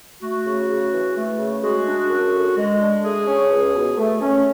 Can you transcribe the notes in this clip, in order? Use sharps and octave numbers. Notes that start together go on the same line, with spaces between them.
A3 F#4
C#3
C#3
E3
A3
C#3
G#3 F#4
D4
F#2
D3
G#3
D4
A3 G#4
C#4
C#2
B2
A3
C#4